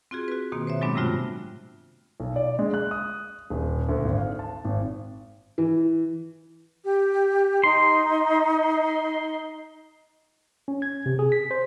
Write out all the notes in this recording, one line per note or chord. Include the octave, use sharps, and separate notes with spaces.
C4 F4 F#4 G#4
F#4 B4
B2 D#3 A#3 C4
C5 C#5 E5
A2 F#3 G#3 B3 C4 D4
G2 C3 G3 A3 F4 F#4
B1
D5
G#3
F#6
D#6
D#1
D2
G#1
F5
A5
G#1
E3
G4
D#4 C6
C#4
G#6
C3
G#4
B6
C5